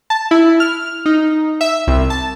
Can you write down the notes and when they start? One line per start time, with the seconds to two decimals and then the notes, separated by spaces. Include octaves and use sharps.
0.10 A5
0.31 E4
0.60 F6
1.06 D#4
1.61 E5
1.87 C2
2.10 A5